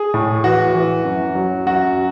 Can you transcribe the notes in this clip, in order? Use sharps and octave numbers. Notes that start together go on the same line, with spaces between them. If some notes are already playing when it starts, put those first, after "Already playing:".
Already playing: G#4
A2
E3 F#4
E3
F#2
F#3
F#2 F#4